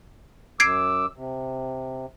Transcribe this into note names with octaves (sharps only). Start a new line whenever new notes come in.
F#2 D6 E6 G#6 C7 D7
C3